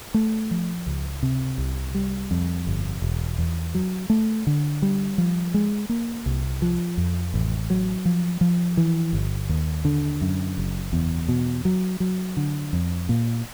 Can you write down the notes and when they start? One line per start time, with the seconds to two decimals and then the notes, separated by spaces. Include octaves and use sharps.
0.14 A3
0.51 F3
0.86 C#2
1.23 C3
1.58 C2
1.95 G3
2.31 F2
2.67 G1
3.02 E1
3.39 E2
3.75 F#3
4.10 A3
4.47 D3
4.82 G3
5.18 F3
5.54 G#3
5.89 A#3
6.26 C2
6.62 F3
6.97 F2
7.34 A1
7.70 F#3
8.05 F3
8.41 F3
8.77 E3
9.13 G1
9.49 D#2
9.85 D3
10.21 F#2
10.58 F#1
10.93 E2
11.29 B2
11.65 F#3
12.00 F#3
12.37 D3
12.73 F2
13.09 A#2